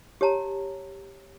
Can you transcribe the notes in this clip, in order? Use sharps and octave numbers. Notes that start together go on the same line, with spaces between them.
G4 C#5 A5 A#5